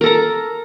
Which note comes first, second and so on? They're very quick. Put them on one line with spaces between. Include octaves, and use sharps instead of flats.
A#4 A4 A#5